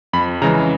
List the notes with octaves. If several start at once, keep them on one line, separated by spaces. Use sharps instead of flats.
F2 B5
C#3 E3 G#3 A#5